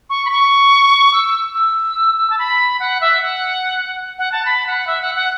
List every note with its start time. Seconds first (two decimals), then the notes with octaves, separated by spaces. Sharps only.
0.10 C#6
0.25 B5
0.30 C#6
1.14 E6
1.55 E6
2.30 A5
2.39 B5
2.79 F#5
3.01 E5
3.21 F#5
4.18 F#5
4.32 A5
4.45 B5
4.67 F#5
4.87 E5
5.01 F#5
5.15 F#5